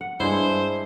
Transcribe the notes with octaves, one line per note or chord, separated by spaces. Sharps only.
F#5
G2 G#3 D4 E4 C5